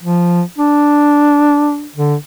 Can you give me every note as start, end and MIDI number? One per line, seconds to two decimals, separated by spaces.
0.03 0.41 53
0.58 1.87 62
1.96 2.14 50